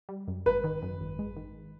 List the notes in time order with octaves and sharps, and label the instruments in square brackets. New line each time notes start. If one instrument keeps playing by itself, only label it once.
[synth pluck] G3
F#2
[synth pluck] G#1 [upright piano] B4
[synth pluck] D#3
F#2
G#1
G#3
D#3